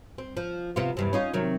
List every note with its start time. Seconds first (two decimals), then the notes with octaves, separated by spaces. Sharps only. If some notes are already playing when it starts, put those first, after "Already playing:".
0.18 C4
0.37 F3
0.76 C3 B3 F4
0.97 E2 G2 C3
1.13 C#4 D#4 F4
1.34 C3 D#3 F#3